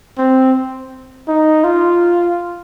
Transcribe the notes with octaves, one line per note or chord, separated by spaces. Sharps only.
C4
D#4
F4